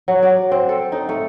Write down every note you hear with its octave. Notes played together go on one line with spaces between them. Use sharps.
F#3
D5
C4
A4
D#4
A3